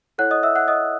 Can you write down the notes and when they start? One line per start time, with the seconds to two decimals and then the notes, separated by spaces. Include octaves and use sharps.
0.18 E4 A4 C#5 F#5 F#6
0.31 D#5 D#6
0.43 E5 E6
0.56 F#5 F#6
0.68 D#5 D#6